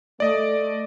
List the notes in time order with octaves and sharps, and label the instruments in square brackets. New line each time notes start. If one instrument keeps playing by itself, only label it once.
[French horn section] A3 [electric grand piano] D5 D#5